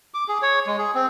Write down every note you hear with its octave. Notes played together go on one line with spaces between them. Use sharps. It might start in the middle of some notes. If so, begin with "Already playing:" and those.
D6
G#4
C#5
G#3
G#4
C4